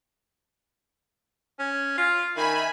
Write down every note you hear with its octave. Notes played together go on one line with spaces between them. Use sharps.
C#4
F4
D#3 E5 G#5 B5